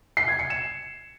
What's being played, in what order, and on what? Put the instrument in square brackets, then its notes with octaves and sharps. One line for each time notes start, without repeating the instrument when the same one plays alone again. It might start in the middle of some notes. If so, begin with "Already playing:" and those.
[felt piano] C7
G#6
C#7
E7